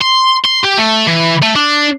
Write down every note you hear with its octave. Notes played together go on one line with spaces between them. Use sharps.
C6
C6
G4
A3
E3
A3
D4